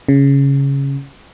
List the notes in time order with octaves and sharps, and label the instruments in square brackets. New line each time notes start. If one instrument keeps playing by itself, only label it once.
[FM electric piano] C#3